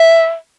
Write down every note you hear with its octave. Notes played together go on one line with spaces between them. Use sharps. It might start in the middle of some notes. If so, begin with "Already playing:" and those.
Already playing: E5